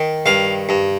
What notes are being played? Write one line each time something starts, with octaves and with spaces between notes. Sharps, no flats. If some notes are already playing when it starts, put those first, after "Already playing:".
Already playing: D#3
G2 F5
G2